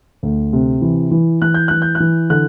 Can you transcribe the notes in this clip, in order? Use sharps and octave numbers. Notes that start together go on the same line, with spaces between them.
D2
C3
E3
E3
E3 F#6
G6
E3 F#6
G6
F#6
E3
D3 F#6